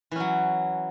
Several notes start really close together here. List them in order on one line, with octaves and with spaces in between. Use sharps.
E3 C#4 F#3